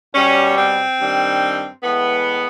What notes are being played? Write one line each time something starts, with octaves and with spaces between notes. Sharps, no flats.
B2 G3 C#4
C4
G2 D#3 G3
A2 E3 G#3 B3